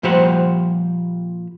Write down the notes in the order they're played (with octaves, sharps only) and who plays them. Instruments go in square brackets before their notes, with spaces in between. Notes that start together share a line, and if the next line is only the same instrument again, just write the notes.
[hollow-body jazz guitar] A#2 F3 G3 G4 C5 F#5